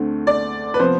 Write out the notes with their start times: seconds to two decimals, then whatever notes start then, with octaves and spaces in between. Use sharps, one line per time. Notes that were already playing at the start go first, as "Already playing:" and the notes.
Already playing: D2 D3 A3 C4
0.27 D5
0.74 B4
0.79 C3 F3 B3 C5